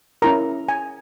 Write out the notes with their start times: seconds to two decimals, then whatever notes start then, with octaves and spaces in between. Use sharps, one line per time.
0.22 C#4 E4 A#4 A#5
0.69 G#5